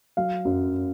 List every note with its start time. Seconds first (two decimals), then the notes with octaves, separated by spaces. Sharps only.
0.17 F#3 F5
0.45 F#2